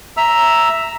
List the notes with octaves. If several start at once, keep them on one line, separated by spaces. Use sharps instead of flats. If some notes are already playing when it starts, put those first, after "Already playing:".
E5 A#5 E6